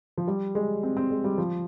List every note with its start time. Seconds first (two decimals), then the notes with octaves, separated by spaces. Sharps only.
0.18 F3
0.28 G3
0.55 G#3
0.83 C4
0.97 C4
1.11 G#3
1.24 G3
1.38 F3